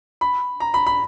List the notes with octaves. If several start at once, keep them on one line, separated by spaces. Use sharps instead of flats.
B5
A#5
B5
B5